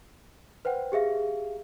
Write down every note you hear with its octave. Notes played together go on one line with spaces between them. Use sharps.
B4 C5 F#5 G5
G4 G#4 E5 F5